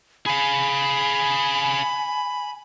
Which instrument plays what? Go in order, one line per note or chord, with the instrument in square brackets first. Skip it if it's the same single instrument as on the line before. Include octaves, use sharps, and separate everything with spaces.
[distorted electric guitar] G#4 F5 [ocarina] G#5 [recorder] B5